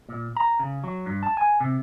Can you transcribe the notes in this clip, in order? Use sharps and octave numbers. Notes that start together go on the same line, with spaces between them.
A#2
A#5
C#3
F#3
G2
A5
G#5
C3